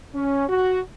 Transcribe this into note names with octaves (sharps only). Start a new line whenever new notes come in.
C#4
F#4